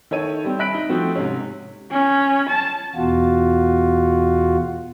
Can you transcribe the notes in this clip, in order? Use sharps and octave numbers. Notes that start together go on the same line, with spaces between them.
D#3 E4 A4 C#5 D#7
G3 C4
E5 B5 F#6 B6 D7
D#4
F3 A3 C4 F#4
G#2 C3 C#4
C#4
A5
E2 B2 F4 F#4